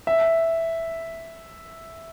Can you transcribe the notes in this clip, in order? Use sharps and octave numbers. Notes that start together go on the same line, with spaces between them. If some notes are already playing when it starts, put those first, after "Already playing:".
E5